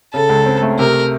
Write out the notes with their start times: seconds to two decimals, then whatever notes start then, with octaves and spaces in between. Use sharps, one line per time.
0.14 C#3 A4
0.29 C#2
0.46 C4
0.62 A3
0.79 C3 A#4